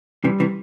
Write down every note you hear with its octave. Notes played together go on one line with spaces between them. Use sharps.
C3 E3 G3
C3 E3